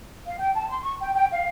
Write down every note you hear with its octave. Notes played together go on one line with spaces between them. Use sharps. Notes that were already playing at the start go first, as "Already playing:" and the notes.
F5
G5
A5
C6
C#6
G5
G5
F5